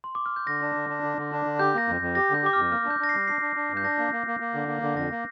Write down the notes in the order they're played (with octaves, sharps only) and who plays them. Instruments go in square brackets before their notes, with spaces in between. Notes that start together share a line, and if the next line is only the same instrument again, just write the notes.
[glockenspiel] C6
D6
F6
G6
[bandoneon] D3 [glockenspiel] A#6
[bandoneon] D4
D3
D4
D3
D3
D4
D3
[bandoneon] G4 [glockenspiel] G6
[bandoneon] A#3 [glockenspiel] A#6
[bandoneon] F2
F2
[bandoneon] G4 [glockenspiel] A#6
[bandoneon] D3 [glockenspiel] G6
[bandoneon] G4 [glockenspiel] D6
[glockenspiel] F6
[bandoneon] F2
[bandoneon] A#3 [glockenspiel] F6
[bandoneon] D4
[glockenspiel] G6
[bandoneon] D4 [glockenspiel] A#6
[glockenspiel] C7
[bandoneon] G3
[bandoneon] D4 [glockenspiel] C7
[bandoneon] D4
D4
G2
[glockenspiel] G6
[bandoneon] D4 [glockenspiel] A#6
[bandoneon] A#3
A#3
A#3
A#3
D3
A#3
D3
[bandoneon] F2 [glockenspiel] A#6
[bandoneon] A#3